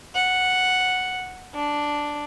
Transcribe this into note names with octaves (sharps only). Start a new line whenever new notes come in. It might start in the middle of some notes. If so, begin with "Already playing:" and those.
F#5
D4